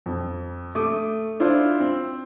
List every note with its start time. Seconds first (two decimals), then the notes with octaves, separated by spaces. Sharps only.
0.06 F2
0.75 A3 D6 D#6
1.40 D4 E4 F4 C5
1.80 C4